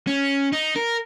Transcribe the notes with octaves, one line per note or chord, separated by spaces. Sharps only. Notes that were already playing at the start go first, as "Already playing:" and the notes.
C#4
D#4
A#4